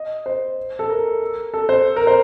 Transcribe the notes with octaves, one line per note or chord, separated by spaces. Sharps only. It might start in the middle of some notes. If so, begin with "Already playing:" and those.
Already playing: D#5
C5
A4
A#4
A4
C5
A#4
C5